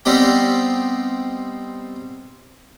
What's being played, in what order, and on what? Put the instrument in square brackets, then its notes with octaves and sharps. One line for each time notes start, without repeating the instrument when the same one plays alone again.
[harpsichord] G3 B3 C4 D#4 G4